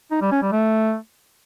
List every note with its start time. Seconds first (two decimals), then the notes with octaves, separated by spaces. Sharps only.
0.12 D#4
0.22 G3
0.32 C#4
0.42 G3
0.52 A3